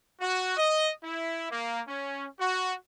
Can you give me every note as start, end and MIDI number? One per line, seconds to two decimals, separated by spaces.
0.21 0.55 66
0.57 0.91 75
1.04 1.47 64
1.51 1.81 58
1.88 2.26 61
2.40 2.75 66